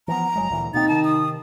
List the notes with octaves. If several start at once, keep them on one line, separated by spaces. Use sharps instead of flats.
E3 F3 B3 A#5
F#1 F#3 G#3
D2 A#2 E3
B2 A#3 C4 D#4 A6
C3 D#3 A5
D#6